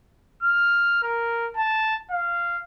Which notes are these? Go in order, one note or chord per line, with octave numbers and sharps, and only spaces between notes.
F6
A#4
A5
F5